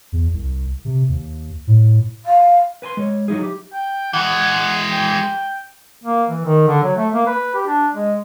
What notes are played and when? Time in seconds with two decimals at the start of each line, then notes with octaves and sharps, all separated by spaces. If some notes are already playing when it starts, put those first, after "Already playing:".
0.12 E2
0.33 C2
0.85 C3
1.09 D#2
1.67 A2
2.26 F5
2.82 B4 G#5 A#5 C6
2.97 G#3 C#5
3.28 F#3 D#4 E4 G#4
3.42 G4
3.74 G5
4.13 E3 G#3 F#5
4.92 G5
6.04 A#3
6.29 E3
6.45 D#3
6.67 D3
6.83 F#3
6.96 A3
7.14 A#3
7.27 B4
7.54 G4
7.67 D4
7.93 G#3